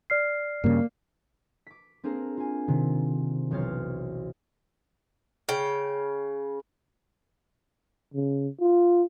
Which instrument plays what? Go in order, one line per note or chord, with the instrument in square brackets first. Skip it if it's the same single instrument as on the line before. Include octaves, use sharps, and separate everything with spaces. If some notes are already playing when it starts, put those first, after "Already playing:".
[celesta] D5 F6 C7
[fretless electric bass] G2 C#3 [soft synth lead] A#3
[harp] D6 B6
A#3 C4 D4 G#4 A#4
F4 G#5
C3 D#3
E1 B1 C5 C#5 F6 A6
[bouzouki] C#3 G5
[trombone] C#3
F4